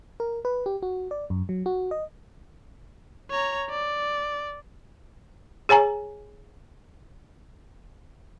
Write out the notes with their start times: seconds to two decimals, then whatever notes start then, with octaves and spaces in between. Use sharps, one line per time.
0.20 A#4
0.45 B4
0.66 G4
0.83 F#4
1.11 D5
1.30 F#2
1.49 F#3
1.66 F#4
1.91 D#5
3.30 C#5 A#5
3.70 D5
5.69 G#4 C#5 G#5 A#5